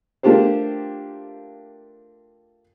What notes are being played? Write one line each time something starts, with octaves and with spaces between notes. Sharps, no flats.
A3 A#3 D4 F4 G4 C5